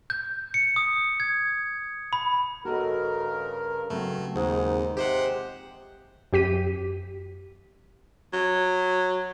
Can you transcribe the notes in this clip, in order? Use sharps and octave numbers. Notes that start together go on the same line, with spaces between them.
G6
C#7
D#6
G#6
B5
G2 C#3 F#4 A4 A#4 D#5
G2 C#3 F#3 A3 C4
D#2 G#2 D#3
C3 F3 G#3 G4 C5 F#5
F#2 G4 B6 D#7
F#3